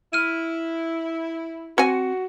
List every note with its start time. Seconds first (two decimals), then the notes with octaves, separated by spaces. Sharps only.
0.13 E4 F6 D#7
1.78 C4 F#4 G#5 C#7